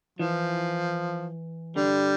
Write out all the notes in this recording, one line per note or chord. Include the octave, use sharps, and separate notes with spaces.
E3 F3
D3 G3